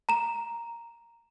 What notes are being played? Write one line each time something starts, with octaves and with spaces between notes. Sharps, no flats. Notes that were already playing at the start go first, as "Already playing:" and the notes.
A#5 E7